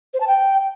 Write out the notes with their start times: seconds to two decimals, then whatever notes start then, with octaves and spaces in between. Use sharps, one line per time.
0.14 C5
0.21 A5
0.27 G5